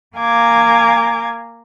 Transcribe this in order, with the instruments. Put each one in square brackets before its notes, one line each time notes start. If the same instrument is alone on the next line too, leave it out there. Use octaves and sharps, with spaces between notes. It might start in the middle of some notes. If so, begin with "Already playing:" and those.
[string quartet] A#3 F5 G#5 A#5 D6 G#6